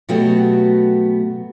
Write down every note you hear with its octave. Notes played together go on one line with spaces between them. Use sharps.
B2 F#3 A3 B3 F#4 G4